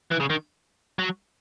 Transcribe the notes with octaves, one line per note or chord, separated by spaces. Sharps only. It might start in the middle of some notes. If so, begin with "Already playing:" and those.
E3
C#3
D#3
F#3